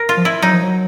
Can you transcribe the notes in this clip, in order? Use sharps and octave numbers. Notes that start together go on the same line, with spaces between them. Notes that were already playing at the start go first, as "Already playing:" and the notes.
Already playing: A#4
F4
F3
E4
F#3 D#4
F3
F#3